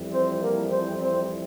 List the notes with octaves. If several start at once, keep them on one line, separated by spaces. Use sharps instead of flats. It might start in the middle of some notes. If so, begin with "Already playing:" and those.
Already playing: F2 E3 G3
C4 C5
A#3 A#4
C4 C5
C4 C5